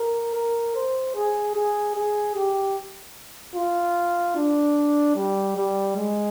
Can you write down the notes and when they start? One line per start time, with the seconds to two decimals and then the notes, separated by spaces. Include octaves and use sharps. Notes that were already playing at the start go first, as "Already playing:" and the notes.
Already playing: A#4
0.35 A#4
0.75 C5
1.15 G#4
1.55 G#4
1.95 G#4
2.35 G4
3.55 F4
4.36 D4
5.16 G3
5.56 G3
5.96 G#3